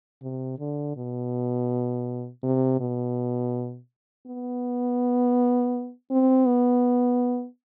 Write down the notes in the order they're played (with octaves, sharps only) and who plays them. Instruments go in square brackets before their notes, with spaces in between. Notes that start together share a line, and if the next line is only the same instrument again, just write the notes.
[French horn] C3
D3
B2
C3
B2
B3
C4
B3